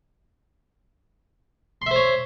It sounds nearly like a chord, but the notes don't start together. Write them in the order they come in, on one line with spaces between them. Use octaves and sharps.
C6 E5 C5 C#5